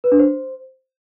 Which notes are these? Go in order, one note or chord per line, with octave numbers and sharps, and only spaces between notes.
B4
D4
C5